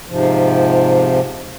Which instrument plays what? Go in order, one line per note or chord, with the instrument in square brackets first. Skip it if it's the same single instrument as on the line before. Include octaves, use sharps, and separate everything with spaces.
[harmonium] G#2 C3 F3